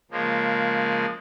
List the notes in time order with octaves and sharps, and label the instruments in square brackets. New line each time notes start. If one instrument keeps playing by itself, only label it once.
[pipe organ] C#3 F3 G#3 A#3